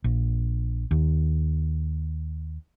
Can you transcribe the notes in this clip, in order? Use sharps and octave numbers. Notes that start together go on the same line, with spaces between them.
A#1
D#2